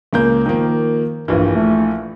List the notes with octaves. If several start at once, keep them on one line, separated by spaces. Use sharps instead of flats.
C#2 A#3 G6
D#3 F3 A#3
A#1 G2 E3
A3